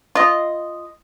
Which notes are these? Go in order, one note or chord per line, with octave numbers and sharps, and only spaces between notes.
F4 D#5